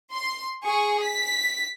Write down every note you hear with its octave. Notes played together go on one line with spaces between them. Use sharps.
C6
G#4 C#6
B6